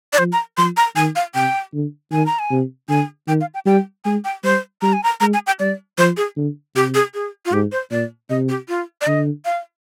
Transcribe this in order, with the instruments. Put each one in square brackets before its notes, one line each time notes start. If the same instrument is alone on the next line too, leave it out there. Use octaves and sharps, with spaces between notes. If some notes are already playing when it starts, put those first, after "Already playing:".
[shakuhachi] D5
[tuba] F3 [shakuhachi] C5
[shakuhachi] A#5
[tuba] F3 [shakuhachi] C6
[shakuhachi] A#5
[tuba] D#3 [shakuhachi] G#5
[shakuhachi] F5
[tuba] C3 [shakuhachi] G5
[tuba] D3
[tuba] D#3 [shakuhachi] G#5
[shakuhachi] A#5
G#5
[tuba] C3
[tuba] D3 [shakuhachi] G#5
[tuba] D#3 [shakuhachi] G5
[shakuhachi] F5
G5
[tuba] G3 [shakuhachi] G5
[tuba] G#3 [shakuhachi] G#5
[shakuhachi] G5
[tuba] G3 [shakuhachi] C5
[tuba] G3 [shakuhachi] A#5
[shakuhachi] G#5
A#5
[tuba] G#3 [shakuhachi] A#5
[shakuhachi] G#5
G5
[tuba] G3 [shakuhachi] D5
[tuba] F3 [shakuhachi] C5
[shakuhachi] G#4
[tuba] D3
[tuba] C3 [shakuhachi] G4
[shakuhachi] G#4
G#4
F4
[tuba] G#2 [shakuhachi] G4
[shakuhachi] C5
[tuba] A#2 [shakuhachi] D5
[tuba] C3 [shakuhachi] D#5
[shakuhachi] G4
F4
D5
[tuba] D3 [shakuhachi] D#5
[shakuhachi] F5